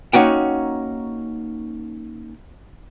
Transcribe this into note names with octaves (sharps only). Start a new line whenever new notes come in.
A#3 C#4 D#4 F#4 F#5 G5